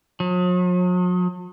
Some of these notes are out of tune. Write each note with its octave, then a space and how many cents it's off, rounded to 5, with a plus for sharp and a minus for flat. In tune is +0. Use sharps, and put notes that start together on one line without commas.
F#3 -45